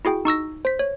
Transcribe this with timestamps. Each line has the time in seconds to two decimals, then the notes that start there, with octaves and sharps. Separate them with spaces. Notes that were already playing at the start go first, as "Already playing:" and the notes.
0.05 E4 F#4 G#4 G5
0.25 D#4 C#6 E6 A#6
0.65 C5 B6
0.79 C#5